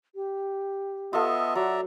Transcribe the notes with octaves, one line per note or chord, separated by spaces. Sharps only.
G4
B3 F4 A4 D#5 E5
F#3 D5 E5 F#5 A#5